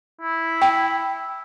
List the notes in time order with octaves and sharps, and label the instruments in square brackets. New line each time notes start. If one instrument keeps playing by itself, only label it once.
[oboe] E4
[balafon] G5